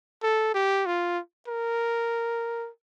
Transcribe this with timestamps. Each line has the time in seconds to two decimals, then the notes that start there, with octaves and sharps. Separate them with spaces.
0.23 A4
0.54 G4
0.86 F4
1.48 A#4